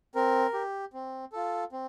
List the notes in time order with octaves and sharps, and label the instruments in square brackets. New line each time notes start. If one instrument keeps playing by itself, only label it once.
[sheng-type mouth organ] C4 A#4
G4
C4
F4 A4
C4